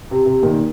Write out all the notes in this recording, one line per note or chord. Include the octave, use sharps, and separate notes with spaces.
C3
C3
A#2 D#3